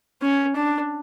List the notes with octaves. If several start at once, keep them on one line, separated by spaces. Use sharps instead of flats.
C#4
D4